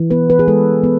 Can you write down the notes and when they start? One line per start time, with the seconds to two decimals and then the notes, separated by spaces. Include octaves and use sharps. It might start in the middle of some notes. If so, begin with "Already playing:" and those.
Already playing: E3
0.11 B3 B4
0.30 B4
0.39 G#4
0.48 G#3 A4
0.84 B3